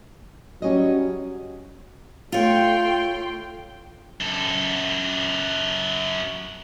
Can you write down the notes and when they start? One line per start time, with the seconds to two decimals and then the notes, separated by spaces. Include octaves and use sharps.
0.62 F#3 G3 C#4 D#5
2.32 A3 F4 C#5 G5 C6
4.21 F#2 A4